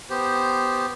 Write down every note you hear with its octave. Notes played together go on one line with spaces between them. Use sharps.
B3 G4 C5